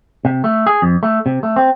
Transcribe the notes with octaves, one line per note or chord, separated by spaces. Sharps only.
C3
A3
G#4
F2
A3
C3
A3
C4